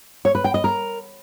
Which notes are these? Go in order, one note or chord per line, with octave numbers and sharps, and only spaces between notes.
C#5
B4
G5
D#5
A#4